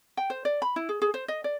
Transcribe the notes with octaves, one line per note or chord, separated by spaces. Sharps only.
G5
C5
D5
B5
E4
G#4
G#4
C5
D#5
D5